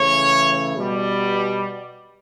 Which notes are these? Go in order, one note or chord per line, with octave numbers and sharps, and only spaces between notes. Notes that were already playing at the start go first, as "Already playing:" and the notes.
Already playing: C#3 E3 A3 C#5
B2 G3